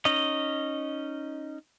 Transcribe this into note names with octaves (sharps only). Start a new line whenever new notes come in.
C#4 D#4 D#5